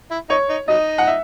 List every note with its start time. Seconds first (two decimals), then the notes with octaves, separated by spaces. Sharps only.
0.11 E4
0.30 D#4 C#5
0.49 D#4
0.68 F#3 D#4 D#5
0.98 F#5
1.07 E5